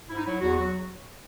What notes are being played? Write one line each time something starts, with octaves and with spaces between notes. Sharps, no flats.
G#2 E4
D#4
F#3 E4
E2 F#4
F#3 F#4